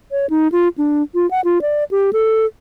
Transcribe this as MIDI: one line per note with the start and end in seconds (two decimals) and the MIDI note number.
0.11 0.26 73
0.30 0.48 63
0.52 0.68 65
0.78 1.02 62
1.15 1.29 65
1.31 1.41 78
1.45 1.62 65
1.62 1.84 74
1.91 2.10 67
2.13 2.46 69